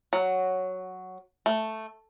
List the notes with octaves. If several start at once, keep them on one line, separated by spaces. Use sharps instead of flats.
F#3
A3